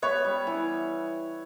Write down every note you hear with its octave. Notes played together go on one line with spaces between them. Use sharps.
B3 C#5
G3
E3